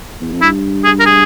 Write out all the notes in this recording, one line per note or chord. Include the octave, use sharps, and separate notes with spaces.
E2
F2
G2 E4
G#4
A#4
G#4